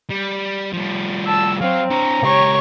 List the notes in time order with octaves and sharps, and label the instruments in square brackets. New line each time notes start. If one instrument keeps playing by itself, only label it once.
[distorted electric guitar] G3
F3 G3
[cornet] A5 [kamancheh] E6
[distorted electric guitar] F#3 [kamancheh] C4 [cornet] F5
[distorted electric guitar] D4 C#5 [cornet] A#5
[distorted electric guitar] C#2 G4 [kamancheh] C#5 C#6